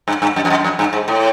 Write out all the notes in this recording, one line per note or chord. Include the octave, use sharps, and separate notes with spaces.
G2
G2
F#2
F2
F#2
F2
G2
G#2
A2